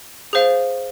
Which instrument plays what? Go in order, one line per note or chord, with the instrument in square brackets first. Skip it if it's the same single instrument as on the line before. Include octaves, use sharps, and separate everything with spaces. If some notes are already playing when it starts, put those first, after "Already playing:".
[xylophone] G#4 C5 F5